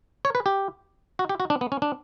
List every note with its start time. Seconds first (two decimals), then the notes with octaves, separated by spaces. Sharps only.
0.25 C#5
0.35 B4
0.46 G4
1.19 F#4
1.29 G4
1.40 F#4
1.50 D4
1.61 B3
1.72 C#4
1.82 D4